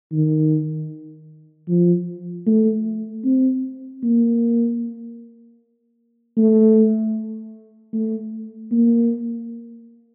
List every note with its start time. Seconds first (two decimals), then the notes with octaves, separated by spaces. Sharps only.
0.12 D#3
1.69 F3
2.46 A3
3.25 C4
4.03 A#3
6.37 A3
7.93 A3
8.71 A#3